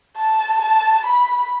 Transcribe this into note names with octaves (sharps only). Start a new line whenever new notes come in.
A5
A5
B5